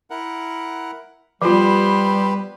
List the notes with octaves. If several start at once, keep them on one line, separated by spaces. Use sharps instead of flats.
E4 A#4 F#5
F3 G3 B3 F4 G4 B4 C5